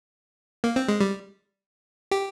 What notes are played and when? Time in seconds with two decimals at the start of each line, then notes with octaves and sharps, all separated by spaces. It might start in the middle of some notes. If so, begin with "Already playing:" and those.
0.64 A#3
0.76 C4
0.88 G#3
1.00 G3
2.11 G4